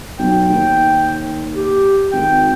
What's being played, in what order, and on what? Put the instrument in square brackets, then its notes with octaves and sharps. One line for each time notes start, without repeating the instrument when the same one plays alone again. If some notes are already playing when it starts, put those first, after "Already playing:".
[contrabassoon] B1 [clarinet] G5
[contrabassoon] D#2
[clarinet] G4
[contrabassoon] G#1 [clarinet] G5